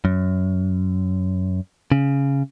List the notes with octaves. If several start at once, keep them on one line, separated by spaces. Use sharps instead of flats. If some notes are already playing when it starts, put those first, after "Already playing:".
F#2
C#3